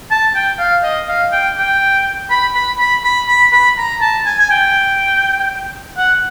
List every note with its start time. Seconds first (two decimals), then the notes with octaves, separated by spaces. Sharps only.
0.11 A5
0.35 G5
0.59 F5
0.83 D#5
1.08 F5
1.32 G5
1.57 G5
2.30 B5
2.55 B5
2.79 B5
3.04 B5
3.28 B5
3.53 B5
3.78 A#5
4.01 A5
4.26 G#5
4.40 G#5
4.50 G5
5.97 F#5